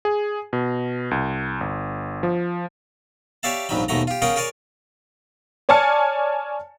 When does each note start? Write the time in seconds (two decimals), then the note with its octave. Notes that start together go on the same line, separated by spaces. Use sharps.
0.05 G#4
0.53 B2
1.11 C2
1.61 G1
2.23 F3
3.43 G4 C#5 D5 E5 F5 A5
3.69 A#1 F2 G#2 F#3 G3 B5
3.88 D#2 G#2 B2 A3 F#5 A#5
4.07 F4 G4
4.22 C#4 F4 G#4 A#4 F#5 G5
4.36 G#4 A#4 C#5 D5 G#5
5.69 C#5 D5 G#5 A5 F6 C#7